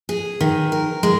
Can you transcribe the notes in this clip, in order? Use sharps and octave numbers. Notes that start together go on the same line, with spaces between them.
G#4
D#3
A#4
G#3